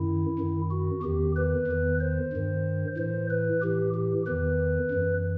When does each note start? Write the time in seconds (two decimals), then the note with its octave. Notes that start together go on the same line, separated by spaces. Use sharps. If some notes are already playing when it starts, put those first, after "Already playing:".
Already playing: F#2 D#3 E4
0.39 F#2 D#3
0.71 F#4
1.03 E2 D#3 G4
1.36 B4
1.67 E2 D#3
2.00 C5
2.33 G2 D#3
2.97 A2 E3 C5
3.30 B4
3.62 A2 E3 G4
3.94 G4
4.26 E2 D#3 B4
4.91 F#2 E3